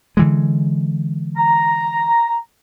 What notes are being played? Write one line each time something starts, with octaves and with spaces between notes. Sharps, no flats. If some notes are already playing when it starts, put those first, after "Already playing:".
D3 E3 G#3
A#5